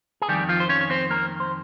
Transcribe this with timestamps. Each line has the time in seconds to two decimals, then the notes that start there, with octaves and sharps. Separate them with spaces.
0.22 G#4
0.29 F2 D#3 G3 G4
0.49 F3 F4
0.60 C5
0.69 C#4 C#5
0.81 C#5
0.90 C4 C5
1.11 A#3 A#4
1.40 C5